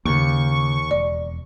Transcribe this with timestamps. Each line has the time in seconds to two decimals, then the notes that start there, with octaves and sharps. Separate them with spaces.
0.05 D#2 C#3 A#3 C#6
0.91 E1 D5